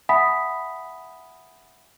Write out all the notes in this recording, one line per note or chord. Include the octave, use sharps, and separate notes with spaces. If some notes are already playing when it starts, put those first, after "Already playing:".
E5 F#5 G#5 B5 D#6 B6